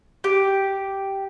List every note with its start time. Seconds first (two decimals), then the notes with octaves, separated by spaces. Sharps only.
0.24 G4